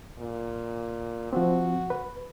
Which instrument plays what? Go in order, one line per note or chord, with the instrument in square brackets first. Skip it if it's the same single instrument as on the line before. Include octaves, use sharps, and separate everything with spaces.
[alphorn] A#2
[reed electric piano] F3 C4 [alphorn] F#4
[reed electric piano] B4